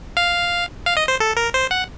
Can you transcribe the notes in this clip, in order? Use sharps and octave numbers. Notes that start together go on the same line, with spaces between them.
F5
F5
D#5
C5
A4
A#4
C5
F#5